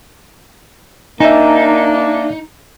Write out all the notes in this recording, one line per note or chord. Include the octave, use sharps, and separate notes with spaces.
A#3 D4 D#4 E5 G#5